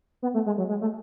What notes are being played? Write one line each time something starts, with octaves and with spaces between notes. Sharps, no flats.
B3
A3
G#3
F#3
G#3
A3